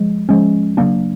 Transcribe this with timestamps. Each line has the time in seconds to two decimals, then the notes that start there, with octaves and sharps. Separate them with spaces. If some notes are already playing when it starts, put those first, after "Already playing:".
Already playing: F3 G#3
0.29 F3 G#3 C#4
0.77 C#3 F#3 A#3 D4